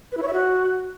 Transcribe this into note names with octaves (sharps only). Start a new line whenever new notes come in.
B4
E4
C#5
E5
F#4